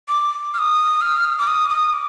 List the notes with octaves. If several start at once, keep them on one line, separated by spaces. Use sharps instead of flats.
D6
F6
D#6
F6
D6
D#6
D#6
D6